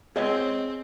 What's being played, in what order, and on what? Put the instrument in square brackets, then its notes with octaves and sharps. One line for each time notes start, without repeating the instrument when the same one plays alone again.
[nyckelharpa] C4 [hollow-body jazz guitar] G#4 C#5 D#5